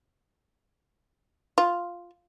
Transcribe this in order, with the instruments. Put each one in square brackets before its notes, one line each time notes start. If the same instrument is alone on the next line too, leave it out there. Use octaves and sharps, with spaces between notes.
[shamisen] F4